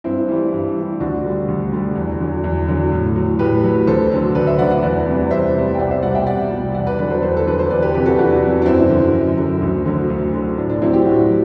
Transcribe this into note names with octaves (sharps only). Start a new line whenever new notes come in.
G2 C4 E4
E3 G3
G2
E3 G3
D2 D4 F#4
D3 G3
D2
D3 G3
E2
D3 F#3
E2
D3 F#3
A2
F#3
A2 G4 B4
F#3
D2 A4 C5
D3 F#3
D2 B4 D5
C5 E5
D3 F#3 D5 F#5
D5 F#5
E2 B4 D5
C3 G3
E2 C5 E5
C3 G3
G5
C2 D5 F#5
C5 E5
B2 G3 D5 F#5
E5 G5
C2 D5 F#5
B2 G3
E2 D5 F#5
B4 D5
D3 F#3 B4 D5
A4 C5
E2 A4 C5
A4
D3 F#3 B4
C5
E2 B4 D5
G4 B4
C3 F#3 G4 B4
F#4 A4
E2 D4 F#4
C3 F#3
D4
F#2 C4 E4
D3 F#3
F#2
D3 F#3
D2
D3 F#3
D2
D3 F#3
A2 D4
D4
F#3 C4 E4
E4 G4
A2 D4 F#4
F#3